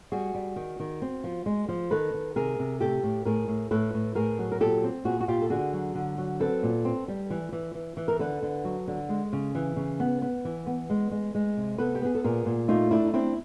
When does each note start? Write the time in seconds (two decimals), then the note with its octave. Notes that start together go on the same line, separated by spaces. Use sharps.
0.12 G3 F#4 G#4
0.34 G3
0.56 D#3
0.80 D#3
1.02 C4
1.24 F3
1.46 G#3
1.68 F3
1.91 D#3 A4 B4
2.14 D#3
2.36 C3 G#4 A#4
2.59 C3
2.80 A2 G4 A4
3.03 A2
3.25 A2 G#4 A#4
3.48 A2
3.71 A2 A4 B4
3.94 A2
4.15 A2 G#4 A#4
4.39 F#3
4.52 A#4
4.60 A#2 G4 A4
4.84 C4
5.05 A#2 F#4 G#4
5.20 F#4
5.28 A#2 F4 G4
5.42 A4
5.50 D3 F#4 G#4
5.74 F#3
5.95 D3
6.18 F#3
6.40 C4 A4 B4
6.63 A#2
6.85 C4
7.08 G3
7.30 E3
7.52 E3
7.75 E3
7.97 E3
8.08 A#4
8.19 D3 A4 B4
8.42 D3
8.64 F#3
8.87 D3
9.09 G#3
9.33 C#3
9.55 E3
9.76 C#3
10.00 B3
10.22 B3
10.45 E3
10.67 B3
10.90 G#3
11.11 G#3
11.35 G#3
11.57 C3
11.78 B3 A4 B4
11.95 G4
12.02 B3 G#4
12.15 A4
12.24 A#2 G#4 A#4
12.46 A#2
12.68 A3 D#4 F4
12.91 A3 D4 E4
13.06 D#4
13.14 C4 D4 E4